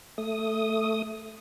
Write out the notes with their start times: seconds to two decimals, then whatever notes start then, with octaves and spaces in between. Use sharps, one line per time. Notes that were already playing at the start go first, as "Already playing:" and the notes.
0.18 A3 D#6